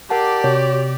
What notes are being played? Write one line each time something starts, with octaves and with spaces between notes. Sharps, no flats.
G4 A#4 D5 F#5 A5
C3 F#4 C#5